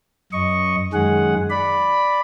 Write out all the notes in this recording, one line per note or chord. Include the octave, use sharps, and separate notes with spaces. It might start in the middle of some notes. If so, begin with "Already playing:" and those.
F#2 D#5 C#6
F#2 D#3 G#3 G#4 F#5
D5 B5